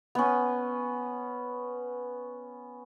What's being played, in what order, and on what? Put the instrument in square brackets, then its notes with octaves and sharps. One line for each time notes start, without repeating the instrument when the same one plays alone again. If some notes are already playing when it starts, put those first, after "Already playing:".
[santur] B3 C#4